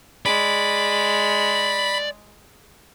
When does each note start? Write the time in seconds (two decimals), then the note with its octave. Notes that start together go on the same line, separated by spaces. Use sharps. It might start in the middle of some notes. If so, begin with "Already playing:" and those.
0.26 G#3 D5 B5